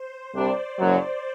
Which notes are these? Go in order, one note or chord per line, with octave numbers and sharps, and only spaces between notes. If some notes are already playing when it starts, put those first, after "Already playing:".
Already playing: C5
C2 C3 G3 D4 D5
F#1 F#2 F#3